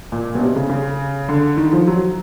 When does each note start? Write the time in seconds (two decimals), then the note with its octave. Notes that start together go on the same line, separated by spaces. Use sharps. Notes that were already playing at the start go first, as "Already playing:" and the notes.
0.12 A#2
0.35 B2
0.41 C3
0.56 C#3
0.69 C#3
1.29 D3
1.57 D#3
1.73 F3
1.87 F#3